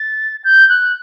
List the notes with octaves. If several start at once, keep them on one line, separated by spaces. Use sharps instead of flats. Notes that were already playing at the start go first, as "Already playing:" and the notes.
Already playing: A6
G6
F#6